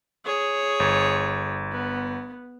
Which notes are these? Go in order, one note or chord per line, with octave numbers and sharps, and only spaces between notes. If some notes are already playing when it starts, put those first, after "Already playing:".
G#4 C#5
G1
B3